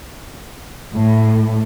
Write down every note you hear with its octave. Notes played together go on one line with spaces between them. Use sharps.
A2